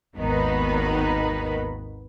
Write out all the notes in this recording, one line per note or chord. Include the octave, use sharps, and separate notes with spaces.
G#1 D#2 D#3 B3 D#4 B5